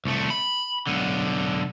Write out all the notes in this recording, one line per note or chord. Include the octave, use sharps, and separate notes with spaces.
C2 A3
B5
B1 D3